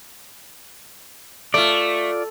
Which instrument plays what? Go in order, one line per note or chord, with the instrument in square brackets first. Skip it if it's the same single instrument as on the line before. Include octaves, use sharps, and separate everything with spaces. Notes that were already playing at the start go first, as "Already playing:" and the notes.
[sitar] A3 [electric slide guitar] F4 D5